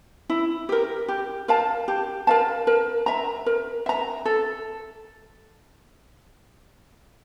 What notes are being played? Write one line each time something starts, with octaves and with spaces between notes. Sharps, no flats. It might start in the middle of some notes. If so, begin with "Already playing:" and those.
E4
G4 A#4
G4
A#4 F5 A5
G4
A#4 F5 A5
A#4
E5 A#5
A#4
E5 A#5
A4